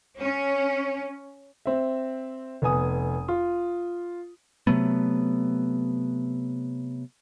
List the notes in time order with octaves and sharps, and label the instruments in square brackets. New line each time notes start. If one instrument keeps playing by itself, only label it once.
[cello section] C#4
[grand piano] C4 E5
F1 B3 G#5 D#6
F4
[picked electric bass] C3 F#3 A3 B3